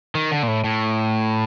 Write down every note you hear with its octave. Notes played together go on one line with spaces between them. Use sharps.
D#3
D3
A#2
A2
A2